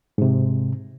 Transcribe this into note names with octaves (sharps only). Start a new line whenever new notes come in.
G#2 C3